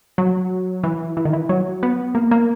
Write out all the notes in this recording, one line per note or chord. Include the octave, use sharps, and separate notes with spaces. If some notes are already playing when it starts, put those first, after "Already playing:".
F#3
E3
E3
D#3
E3
F#3
B3
A#3
A#3